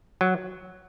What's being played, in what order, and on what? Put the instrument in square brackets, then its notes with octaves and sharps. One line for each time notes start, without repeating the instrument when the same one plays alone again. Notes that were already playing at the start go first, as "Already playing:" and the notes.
[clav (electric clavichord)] F#3